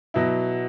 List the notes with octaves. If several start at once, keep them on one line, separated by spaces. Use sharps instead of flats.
B2 F#3 E4